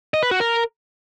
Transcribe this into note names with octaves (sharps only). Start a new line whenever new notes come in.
D#5
B4
F#4
A#4